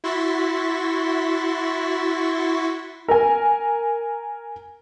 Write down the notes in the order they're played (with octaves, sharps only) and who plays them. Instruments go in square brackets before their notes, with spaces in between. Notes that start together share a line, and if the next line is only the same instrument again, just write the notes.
[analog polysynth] E4 F#4 C6 C#6 A6 B6
[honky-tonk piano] A#4 G#5